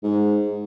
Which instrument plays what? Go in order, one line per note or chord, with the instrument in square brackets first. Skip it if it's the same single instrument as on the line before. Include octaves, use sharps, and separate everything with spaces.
[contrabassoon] G#2